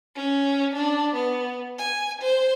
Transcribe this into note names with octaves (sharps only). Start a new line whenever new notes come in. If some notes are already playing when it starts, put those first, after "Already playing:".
C#4
D4
B3
G#5
C5